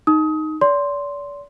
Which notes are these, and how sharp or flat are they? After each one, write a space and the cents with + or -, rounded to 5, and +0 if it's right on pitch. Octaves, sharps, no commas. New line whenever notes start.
D#4 +0 D#6 +25
D5 -40 C6 +0